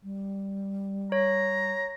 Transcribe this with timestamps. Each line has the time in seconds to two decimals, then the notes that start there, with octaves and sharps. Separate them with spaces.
0.03 G3
1.12 C#5 A#5